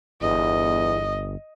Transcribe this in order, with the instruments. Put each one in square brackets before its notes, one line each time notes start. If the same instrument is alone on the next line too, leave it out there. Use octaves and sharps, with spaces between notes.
[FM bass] G1 [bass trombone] E2 [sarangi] D#5